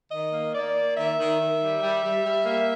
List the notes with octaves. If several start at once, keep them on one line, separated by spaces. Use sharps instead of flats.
D#3 D#5
A#3
A#3 D5
A#3
D#3 E5
D#3
D#3
G3
G3
G3
G3
A#3